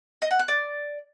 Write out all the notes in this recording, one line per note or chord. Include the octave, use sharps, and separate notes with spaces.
D#5
F#5
F#6
D5